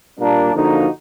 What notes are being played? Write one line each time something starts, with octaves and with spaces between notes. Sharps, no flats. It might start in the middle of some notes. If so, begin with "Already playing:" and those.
A#2 G3 A#3 D4
D3 F3 A#3 D#4 F#4